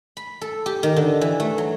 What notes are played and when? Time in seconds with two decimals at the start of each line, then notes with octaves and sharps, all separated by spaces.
0.17 B5
0.41 A4
0.66 G4
0.83 D#3
0.96 D3
1.21 E3
1.40 A3
1.58 F#3